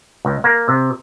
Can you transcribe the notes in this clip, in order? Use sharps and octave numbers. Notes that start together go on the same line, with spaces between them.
C#2
A#3
C3